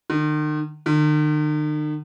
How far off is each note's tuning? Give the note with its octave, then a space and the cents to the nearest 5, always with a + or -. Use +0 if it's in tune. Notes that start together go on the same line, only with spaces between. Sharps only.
D#3 -40
D#3 -45